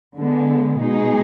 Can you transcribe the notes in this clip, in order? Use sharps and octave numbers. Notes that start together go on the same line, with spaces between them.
D3 G#3 B3
B2 G#3 D#4 G#4